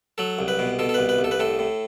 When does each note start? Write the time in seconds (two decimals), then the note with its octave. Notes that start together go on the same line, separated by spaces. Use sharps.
0.18 F#3 A4
0.39 C2
0.48 B4
0.59 B2
0.79 B2 A4
0.89 A4
0.94 C2 B4
1.09 B4
1.19 C2
1.24 A4
1.31 B4
1.39 A2 A4
1.59 A2